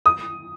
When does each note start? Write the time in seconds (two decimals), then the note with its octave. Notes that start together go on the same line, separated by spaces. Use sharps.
0.06 D#6